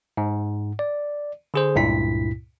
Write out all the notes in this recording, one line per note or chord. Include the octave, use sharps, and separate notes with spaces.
G#2
D5
D3 G#4 C5
C#2 G2 A#2 E4 B6